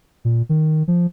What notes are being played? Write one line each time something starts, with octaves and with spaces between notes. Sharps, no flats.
A#2
D#3
F3